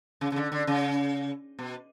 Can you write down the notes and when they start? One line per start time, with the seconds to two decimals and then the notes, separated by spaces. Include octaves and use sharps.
0.21 C#3
0.32 C#3
0.36 D3
0.52 D3
0.67 C#3
1.59 B2